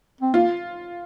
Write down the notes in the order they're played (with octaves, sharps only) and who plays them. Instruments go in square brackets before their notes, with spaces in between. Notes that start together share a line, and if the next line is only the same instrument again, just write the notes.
[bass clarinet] C4
[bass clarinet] A#3 [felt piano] F4